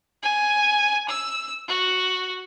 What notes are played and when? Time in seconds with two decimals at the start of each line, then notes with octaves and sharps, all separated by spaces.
0.23 G#5
1.08 E6
1.68 F#4